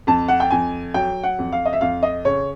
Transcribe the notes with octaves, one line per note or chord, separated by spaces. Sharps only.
F2 A5
F#5
G5
F2 G#5
F#3 G5
F#5
F2
F5
D#5
E5
F2 F5
D#5
C#3 C#5